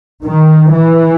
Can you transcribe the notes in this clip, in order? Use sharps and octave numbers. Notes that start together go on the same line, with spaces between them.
D#3
E3